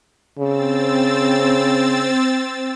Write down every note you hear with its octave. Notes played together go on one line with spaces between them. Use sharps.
C#3 C4 E6 A6